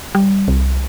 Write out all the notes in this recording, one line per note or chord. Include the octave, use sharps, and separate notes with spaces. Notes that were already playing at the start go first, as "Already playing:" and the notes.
G3
C2